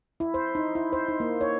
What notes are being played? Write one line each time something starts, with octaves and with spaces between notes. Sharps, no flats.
E4
C5
D#4
E4
C5
D#4
A#3
C#5